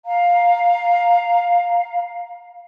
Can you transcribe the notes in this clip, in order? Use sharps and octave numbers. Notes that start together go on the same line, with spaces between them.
F5 A#5